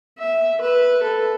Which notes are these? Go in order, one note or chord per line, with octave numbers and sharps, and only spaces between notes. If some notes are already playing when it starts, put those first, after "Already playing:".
E5
B4
A4